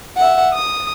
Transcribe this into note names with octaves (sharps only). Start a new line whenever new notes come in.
E5 F#5
D#6